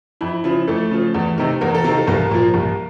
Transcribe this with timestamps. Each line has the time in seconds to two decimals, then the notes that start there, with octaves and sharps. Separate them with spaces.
0.21 F2 E4
0.44 C#3 F3 E4
0.67 F2 A3 A4
0.91 C#3 F3
1.14 E2
1.38 C3 D#3
1.61 E2 A#3 A#4
1.75 A4
1.84 C3 D#3 A#3 A#4
1.98 A4
2.08 C2 A#3 A#4
2.31 A#2 F3
2.54 C2